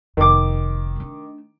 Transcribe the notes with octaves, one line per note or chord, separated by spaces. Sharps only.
F1 D#3 D6
A3 D4